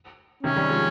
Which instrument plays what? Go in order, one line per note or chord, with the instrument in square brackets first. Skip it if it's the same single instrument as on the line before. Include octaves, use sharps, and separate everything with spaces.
[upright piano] C3 D#3 [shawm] C#4
[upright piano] D#3 G3
F3 G#3